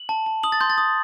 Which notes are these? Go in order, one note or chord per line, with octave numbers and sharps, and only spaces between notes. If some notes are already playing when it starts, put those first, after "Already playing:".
Already playing: F#7
A5
A5
D#6 F#7
A6
C6 G6
A6
D#6